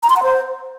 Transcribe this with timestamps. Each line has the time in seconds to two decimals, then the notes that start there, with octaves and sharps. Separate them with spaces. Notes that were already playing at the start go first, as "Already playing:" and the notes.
0.03 A#5
0.10 C6
0.16 F#5
0.23 C5